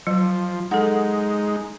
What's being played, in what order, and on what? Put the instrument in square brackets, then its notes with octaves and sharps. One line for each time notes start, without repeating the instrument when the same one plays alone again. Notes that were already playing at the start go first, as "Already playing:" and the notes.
[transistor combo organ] F3 [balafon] F#3
[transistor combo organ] G#3 D#4 [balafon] A4 F#5